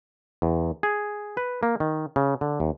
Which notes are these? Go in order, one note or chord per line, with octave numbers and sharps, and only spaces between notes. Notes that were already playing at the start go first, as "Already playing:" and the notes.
E2
G#4
B4
A#3
D#3
C#3
D3
D#2